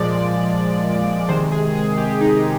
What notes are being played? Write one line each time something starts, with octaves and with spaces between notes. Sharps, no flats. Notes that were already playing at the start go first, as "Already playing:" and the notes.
Already playing: A#2 F3 G#3 D5
C3 D#3 G#3 C5
G#4
G#4
G4
D#4